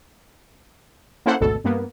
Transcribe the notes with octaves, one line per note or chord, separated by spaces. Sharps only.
A#3 C#4 E4 A4 C5 F#5
G#1 D2 B2 A4
G2 A#3 B3